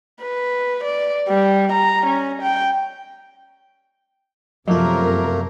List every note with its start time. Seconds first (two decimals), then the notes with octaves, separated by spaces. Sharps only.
0.21 B4
0.84 D5
1.29 G3
1.72 A#5
2.06 C#4
2.42 G5
4.68 F#2 C3 F3 F#3 A3 A#3 F4 A#4